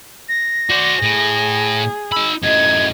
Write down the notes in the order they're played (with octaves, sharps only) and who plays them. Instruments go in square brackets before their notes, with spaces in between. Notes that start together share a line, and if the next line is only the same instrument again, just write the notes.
[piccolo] A#6
[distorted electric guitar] F#4 C5 [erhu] D5
[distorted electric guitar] A2 [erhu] G#4
[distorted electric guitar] D#4 B5 [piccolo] E6
[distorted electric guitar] F#2 A2 [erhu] D#5 [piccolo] G#6